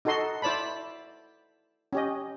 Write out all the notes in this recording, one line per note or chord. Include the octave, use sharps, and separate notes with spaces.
D#4 F#4 A4 D#5 C6
E4 C5 D5 A5 B5
C#4 G4 D#5